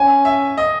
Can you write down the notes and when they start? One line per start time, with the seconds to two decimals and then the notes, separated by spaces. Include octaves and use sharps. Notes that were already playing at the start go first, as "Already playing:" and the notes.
Already playing: C#4 G#5
0.25 E5
0.57 D#5